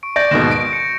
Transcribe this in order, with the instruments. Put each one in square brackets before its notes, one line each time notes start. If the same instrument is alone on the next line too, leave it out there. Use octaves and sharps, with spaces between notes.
[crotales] C#6 D7
[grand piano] D5 [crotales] G6 A#6 D7
[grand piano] D#2 G#2 B2 [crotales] A#6 E7
[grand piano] D7
[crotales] C#7